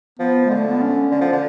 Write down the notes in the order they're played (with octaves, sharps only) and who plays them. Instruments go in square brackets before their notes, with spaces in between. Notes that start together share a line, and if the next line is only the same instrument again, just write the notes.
[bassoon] F3 [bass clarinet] B3
[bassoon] D3 [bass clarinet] G#3
[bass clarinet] A3
B3
C#4
[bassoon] D3
F3
D3